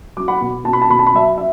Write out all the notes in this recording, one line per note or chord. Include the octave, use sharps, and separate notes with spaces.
F#3 D6
F#5 B5
B2
B2 A5
B5
A5
B2 B5
A5
B5
F#3 E5 A5
E5